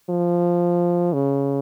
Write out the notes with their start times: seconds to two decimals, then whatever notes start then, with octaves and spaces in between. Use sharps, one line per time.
0.10 F3
1.13 C#3